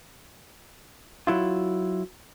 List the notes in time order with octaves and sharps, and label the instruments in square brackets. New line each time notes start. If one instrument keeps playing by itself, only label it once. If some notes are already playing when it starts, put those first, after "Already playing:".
[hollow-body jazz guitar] F#3 E4 F4